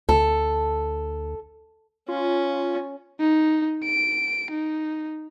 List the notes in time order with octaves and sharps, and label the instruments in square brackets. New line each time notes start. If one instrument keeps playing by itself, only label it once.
[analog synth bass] D2 [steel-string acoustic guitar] A4
[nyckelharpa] C#4 [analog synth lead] F4
[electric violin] D#4
D7
D#4